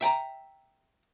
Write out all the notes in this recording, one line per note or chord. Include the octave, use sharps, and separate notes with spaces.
E5 G5 A5 A#5